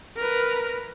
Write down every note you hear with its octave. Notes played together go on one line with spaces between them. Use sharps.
A#4 B4